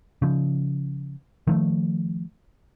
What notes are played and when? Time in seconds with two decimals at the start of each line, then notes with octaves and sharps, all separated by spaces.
0.22 C#3 F3
1.47 D#3 F3 A3